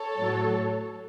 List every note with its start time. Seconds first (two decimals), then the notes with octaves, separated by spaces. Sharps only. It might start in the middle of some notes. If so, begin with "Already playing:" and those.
Already playing: A4 C#5
0.18 A2 F#3